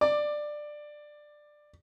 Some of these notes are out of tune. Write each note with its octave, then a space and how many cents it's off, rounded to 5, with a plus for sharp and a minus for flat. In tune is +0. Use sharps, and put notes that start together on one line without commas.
D5 +15 D6 +5